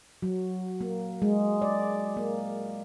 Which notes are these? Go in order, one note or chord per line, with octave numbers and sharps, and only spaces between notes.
F#3
A#3
G#3
D5
A#3